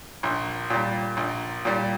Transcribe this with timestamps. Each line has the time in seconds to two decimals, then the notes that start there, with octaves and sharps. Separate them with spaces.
0.23 A#1
0.70 A#2 G3
1.17 A#1
1.65 A#2 G3